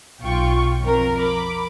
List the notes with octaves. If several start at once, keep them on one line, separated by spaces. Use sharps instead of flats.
B1 F4 G5 C#6
F2 A#4
B5 D6